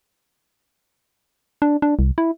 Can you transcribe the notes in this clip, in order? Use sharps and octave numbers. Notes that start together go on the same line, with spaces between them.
D4
D4
C2
E4